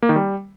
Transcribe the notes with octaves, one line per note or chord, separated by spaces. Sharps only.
A#3
D#3
G3